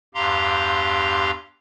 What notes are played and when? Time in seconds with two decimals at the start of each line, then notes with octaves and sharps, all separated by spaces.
0.15 E2 G2 G4 F5 A#5 C6